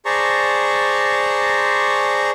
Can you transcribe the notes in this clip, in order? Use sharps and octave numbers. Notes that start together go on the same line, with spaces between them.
G#4 C5 D5 A5 A#5 C#6